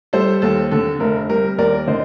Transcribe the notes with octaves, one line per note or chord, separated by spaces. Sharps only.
G3 A4 C5
D#2 A4
D3 A4
F1 A#4
G3 A#4
D#2 A#4 D5
D3 C5 D#5